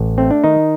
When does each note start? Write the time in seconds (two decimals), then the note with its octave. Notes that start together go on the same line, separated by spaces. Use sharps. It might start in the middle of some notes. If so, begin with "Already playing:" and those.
Already playing: A1
0.18 A3 C4
0.31 D4
0.44 D#3 D#4